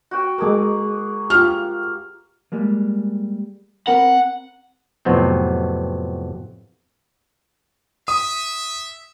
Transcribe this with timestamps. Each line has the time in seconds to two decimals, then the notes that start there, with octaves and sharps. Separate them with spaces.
0.11 F#4 G5
0.38 G#3 A#3 G#4 A4
1.30 F4 G4 F6
2.52 G3 G#3 A#3
3.87 C4 A#4 F#5 B5
5.05 F2 A2 C3 F#3 B3 C4
8.08 E5 D#6